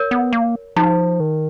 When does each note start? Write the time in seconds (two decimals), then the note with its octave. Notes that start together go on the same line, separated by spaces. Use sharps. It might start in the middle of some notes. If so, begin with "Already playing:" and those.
Already playing: A#4 C#5
0.11 B3
0.33 A#3
0.76 F3 D#4
1.20 D#3